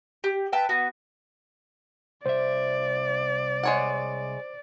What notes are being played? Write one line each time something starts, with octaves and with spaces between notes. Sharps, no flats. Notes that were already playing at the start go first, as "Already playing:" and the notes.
G4
B4 E5 G5 A5
B3 F#4
C2 C5 D5 E5
G#3 C#5 F#5